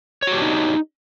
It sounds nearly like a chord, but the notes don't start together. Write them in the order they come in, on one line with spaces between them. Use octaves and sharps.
C#5 F#4 G4 D4 D#4